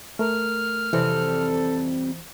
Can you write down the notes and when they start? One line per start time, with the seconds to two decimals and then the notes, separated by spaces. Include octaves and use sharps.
0.19 A3 A#4 F6
0.93 F2 C3 E3 G3 A4 C5